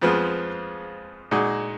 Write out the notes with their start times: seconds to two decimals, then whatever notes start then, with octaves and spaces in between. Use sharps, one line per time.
0.01 F2 F3 G#3 B3 F4
1.31 A#2 G#3 D#4 F#4